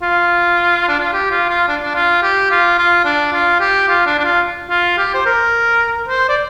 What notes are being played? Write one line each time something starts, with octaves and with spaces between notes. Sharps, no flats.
F4
D4
F4
G4
F4
F4
D4
D4
F4
G4
F4
F4
D4
F4
G4
F4
D4
D4
F4
F4
G4
C5
A#4
C5
D5